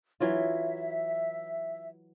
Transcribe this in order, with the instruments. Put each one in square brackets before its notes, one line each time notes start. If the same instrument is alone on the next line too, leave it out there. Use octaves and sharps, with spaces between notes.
[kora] E3 F#3 F4 [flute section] E5